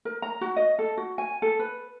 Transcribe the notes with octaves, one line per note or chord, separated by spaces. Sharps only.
A#4
A#5
F#4
D#5
A4
F#4
G#5
A4
B4